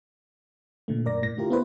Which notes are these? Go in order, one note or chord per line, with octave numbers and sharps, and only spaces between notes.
A#2 D3 A3
F#2 A#2 A#4 D5 A#6
G1 A2 A#6
D3 A3 E4 F4 G4 A#4
B3 E4 B4 C5